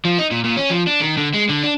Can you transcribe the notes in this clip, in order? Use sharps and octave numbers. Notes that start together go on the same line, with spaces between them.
F3
D#4
A#2
A#2
C#4
F3
D4
D#3
D3
G#3
D3
D4